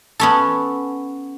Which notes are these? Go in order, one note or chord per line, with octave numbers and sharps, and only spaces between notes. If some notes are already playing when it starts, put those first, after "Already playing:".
B3 C#4 A4